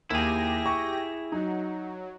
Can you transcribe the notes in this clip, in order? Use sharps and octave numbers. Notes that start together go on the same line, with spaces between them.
D#2 E4 G4 G#4 G5 A#6
C#6
F#3 D#4